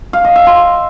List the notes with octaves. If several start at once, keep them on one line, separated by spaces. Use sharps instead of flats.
F5
D#5
E5
C6